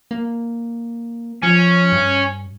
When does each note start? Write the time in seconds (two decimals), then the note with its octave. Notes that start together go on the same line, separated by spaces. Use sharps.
0.11 A#3
1.43 F3 C#4
1.92 G2